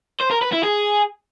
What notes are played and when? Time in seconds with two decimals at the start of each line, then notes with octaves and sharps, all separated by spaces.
0.21 C5
0.31 A#4
0.42 B4
0.53 E4
0.64 G#4